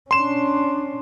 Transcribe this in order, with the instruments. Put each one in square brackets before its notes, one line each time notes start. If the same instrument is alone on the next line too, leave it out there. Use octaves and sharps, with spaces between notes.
[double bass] C#4 D4 [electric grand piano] C6 E7